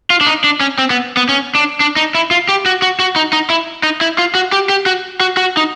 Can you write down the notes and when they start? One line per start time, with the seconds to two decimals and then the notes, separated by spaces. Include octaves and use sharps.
0.10 F4
0.21 D4
0.27 D#4
0.44 D4
0.60 C#4
0.78 C4
0.90 B3
1.17 B3
1.29 C#4
1.55 D4
1.80 D4
1.96 D#4
2.15 E4
2.31 F4
2.49 G4
2.66 F#4
2.82 F#4
3.00 F#4
3.16 D#4
3.33 D#4
3.50 E4
3.83 D#4
4.01 E4
4.18 F4
4.35 F#4
4.52 G4
4.69 G4
4.86 F#4
5.20 F#4
5.37 F#4
5.57 D#4